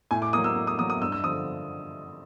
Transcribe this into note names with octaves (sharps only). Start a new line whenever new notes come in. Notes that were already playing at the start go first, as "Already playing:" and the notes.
A2 G#5
D6
F#3 A#3 D#6
E6
A2
D#6
F#3 A#3 D#6
D#6
G2 E6
E6
D3 F3 D#6